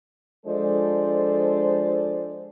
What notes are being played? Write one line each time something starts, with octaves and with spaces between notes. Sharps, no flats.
F3 G#3 D4 A4 C5 D5